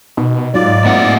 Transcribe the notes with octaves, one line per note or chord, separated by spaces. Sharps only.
B2 D#4
G#2 F#3 D#4 F4 D5
A2 A#3 C4 E5 F#5